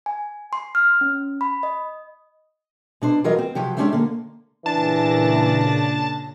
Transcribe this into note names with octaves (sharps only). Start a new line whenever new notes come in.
G#5
C6
F6
C#4
B5
D#5
B2 D4 C5
E3 F#3 G3 F4 A#4 D#5
C4
C3 F3 F#3 G4
G#3 C#4 D4 G4 C5 E5
D3 A#3
A#2 C#3 E3 D4 A5 A#6